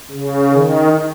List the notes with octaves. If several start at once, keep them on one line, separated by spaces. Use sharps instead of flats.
C#3
D#3